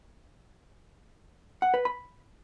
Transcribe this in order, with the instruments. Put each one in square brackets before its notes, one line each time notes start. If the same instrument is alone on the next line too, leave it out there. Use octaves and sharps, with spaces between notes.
[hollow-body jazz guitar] F#5
B4
B5